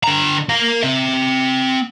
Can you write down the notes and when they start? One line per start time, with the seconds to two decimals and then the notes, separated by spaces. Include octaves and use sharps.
0.03 D3 A#5
0.50 A#4 F5
0.83 C4 E5